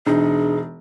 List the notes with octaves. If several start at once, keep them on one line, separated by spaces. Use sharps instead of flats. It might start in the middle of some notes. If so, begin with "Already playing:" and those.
E1 D4 D#4 G#4